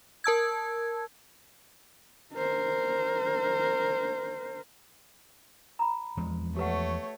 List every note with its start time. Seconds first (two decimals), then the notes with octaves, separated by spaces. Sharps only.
0.24 A#4 A5 E6 G#6
2.34 A#4 C5
5.79 A#5 B5
6.17 E2 F3 G#3
6.57 A3 G4 B4 C#5 F#5